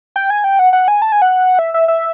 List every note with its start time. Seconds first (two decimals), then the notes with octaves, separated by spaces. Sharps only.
0.16 G5
0.30 G#5
0.44 G5
0.59 F#5
0.73 F#5
0.88 G#5
1.02 A5
1.12 G#5
1.22 F#5
1.59 E5
1.74 E5
1.88 E5